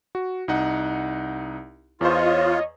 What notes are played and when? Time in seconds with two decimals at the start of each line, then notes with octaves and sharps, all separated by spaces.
0.15 F#4
0.48 C2 D#4 F#5
2.01 E2 F4 C5 C#5 D#5